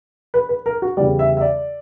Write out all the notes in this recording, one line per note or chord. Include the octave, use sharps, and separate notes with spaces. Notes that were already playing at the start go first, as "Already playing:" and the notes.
B4
B4
A#4
F#4
E2 C#3 G3 D5
E5
E5
D5